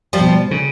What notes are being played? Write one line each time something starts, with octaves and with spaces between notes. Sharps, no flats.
F3 G3
B2
C#3